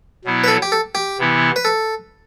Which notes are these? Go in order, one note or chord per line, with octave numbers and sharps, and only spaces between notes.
B2 F#3 B3 E4
B4
A4
G4
A4
G4
C3 E3 B3 E4
B4
A4